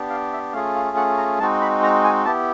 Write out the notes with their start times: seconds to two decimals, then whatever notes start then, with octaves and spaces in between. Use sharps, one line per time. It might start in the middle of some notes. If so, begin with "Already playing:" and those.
Already playing: B3 D4 G4
0.10 F5
0.33 E5
0.53 A3 C#4 F4 G#4 F5
0.76 F5
0.97 F#5
1.18 A#5
1.39 G#3 C4 D#4 F#4 A5
1.61 B5
1.83 A#5
2.04 G#5
2.25 B3 E4 G4 A5